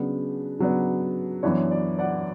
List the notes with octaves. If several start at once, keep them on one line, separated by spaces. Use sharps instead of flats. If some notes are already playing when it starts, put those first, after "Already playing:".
Already playing: C#3 F#3 B3 D4
C#3 F#3 B3 D4
F#2 E3 B3 D4 C#5
D5
D5 F#5